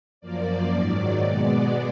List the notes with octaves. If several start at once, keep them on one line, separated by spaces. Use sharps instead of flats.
F#2 F3 A#3 D5
G#2 D#3 F#3
B2 G#3 B3